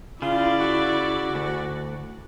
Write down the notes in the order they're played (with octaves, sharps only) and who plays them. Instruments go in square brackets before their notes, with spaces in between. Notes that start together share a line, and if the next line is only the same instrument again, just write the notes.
[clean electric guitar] C#3 [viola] E4 D5 [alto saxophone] F4
[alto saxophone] F#4
[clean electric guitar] D2